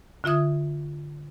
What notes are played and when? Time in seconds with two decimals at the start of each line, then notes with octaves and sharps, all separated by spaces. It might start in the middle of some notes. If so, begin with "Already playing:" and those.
0.24 D3 F4 E5 D#6 G#6